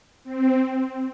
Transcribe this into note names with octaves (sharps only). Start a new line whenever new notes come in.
C4